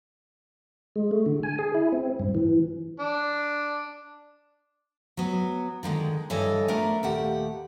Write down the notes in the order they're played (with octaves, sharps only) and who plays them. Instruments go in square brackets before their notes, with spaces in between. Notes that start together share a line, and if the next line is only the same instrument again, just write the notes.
[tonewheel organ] G#3
A3
D3
G#5
G#4
E4
C4
G2
E3
[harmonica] D4
[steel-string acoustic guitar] F#3 B3
D3 D#3 F3 G#3
G2 E3 A4 C#5 D#5 G#5
A3 B3 D4 A#4
D#2 A#2 A3 G4 F#5